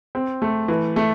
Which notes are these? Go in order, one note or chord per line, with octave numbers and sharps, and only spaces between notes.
C4
A3
E3
A3